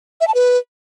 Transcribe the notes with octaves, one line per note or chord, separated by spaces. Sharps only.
E5
A5
B4